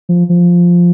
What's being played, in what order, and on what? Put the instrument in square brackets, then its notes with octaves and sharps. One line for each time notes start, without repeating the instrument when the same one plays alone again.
[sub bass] F3
F3